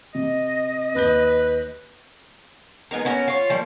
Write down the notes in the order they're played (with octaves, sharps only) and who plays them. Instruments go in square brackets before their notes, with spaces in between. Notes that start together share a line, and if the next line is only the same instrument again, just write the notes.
[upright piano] C3 [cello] D#5
[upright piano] D#2 G6 G7 [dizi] B4
[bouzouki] G#3 B3 D#4 A#4
B3 C#4 F#4 A#4
F4 C#5
F3 G3 A#3